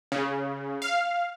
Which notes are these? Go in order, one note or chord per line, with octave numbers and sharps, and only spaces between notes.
C#3
F5